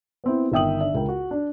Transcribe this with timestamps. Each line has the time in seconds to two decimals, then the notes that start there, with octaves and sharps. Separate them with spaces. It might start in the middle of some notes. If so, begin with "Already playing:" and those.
0.24 B3 C4 E4
0.52 G1 D#3 E5 G5 D#6 F#7
0.80 D4 E5
0.94 C#2 A#4 G5
1.09 F#4
1.31 D4